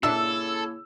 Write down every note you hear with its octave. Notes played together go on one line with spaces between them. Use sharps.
A#2 C#3 A#3 D4 E4 A4 E5 E6